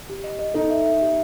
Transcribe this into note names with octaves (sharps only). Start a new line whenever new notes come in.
G4
D#5
D#5
D#4 A4
E5
E5
G4